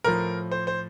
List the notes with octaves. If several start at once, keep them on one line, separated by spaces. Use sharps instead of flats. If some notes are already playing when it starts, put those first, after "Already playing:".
A2 F3 A#4
C5
C5